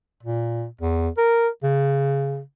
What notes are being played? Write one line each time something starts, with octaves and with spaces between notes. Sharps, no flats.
A#2
E2
A#4
C#3